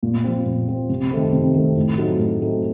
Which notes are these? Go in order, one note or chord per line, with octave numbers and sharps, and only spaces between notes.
A#2
F3 C4
A#2
F3 C4
C3
D#3 A3 C4
C3
D#3 A3 C4
A2
F#3 A3 C4 D#4
A2
F#3 A3 C4 D#4